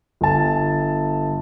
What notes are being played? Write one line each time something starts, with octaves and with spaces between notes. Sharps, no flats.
G1 A5